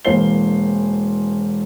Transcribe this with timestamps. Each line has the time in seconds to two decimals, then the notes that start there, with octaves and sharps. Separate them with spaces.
0.05 E1 E3 A#3 C5 C7 G7